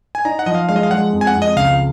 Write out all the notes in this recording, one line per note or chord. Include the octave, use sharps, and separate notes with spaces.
G#5
D#4 A#5
F#5
F3 D#5
F5
G#3 F5
D#5
F5
G#3 F#5
F2
G#5
F#5
F2
D#5
C#2 F5